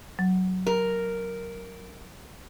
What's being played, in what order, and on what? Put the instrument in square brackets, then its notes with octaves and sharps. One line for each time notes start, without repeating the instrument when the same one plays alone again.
[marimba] F#3
[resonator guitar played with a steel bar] A#4